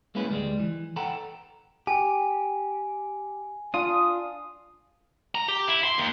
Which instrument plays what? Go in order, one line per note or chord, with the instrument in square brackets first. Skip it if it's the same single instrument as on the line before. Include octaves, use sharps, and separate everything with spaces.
[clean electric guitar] G#3 A#3 C#4 E4 B4
D2 G3 G#3
E3
A4 F#5 G5 A#5 B5
[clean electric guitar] G4 [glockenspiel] G#5
[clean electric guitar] D4 F4 [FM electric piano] D#6
[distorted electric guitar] A#5
G4
E4
C6
D#2